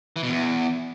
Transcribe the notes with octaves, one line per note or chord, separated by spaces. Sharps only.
E3
B2
E2